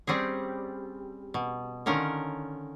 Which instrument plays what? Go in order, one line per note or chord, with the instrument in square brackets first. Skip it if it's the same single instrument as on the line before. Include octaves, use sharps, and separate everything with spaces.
[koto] G3 C4 C#4 G#4
B2
D3 D#3 C#4 F4 A#4